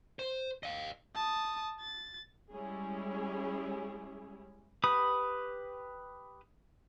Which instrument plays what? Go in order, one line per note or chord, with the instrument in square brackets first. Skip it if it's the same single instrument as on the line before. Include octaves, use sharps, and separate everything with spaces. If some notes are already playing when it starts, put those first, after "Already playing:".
[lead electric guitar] C5
D#5 F5
[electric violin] A5 D#6
A6
[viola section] G3 G#3 C#4 E4 G4 G#4
[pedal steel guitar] G4 B4 B5 D#6